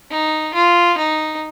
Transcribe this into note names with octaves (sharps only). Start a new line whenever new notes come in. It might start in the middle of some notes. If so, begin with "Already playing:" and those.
D#4
F4
D#4